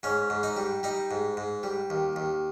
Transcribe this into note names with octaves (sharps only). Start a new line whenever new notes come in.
G#2 C#4
G#2
D#4
G3
G3 D#4
G#2
G#2
G3
D#2
D#2